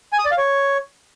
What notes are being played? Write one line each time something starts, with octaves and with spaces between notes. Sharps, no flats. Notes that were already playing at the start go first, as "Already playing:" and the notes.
G#5
D#6
D5
F5
C#5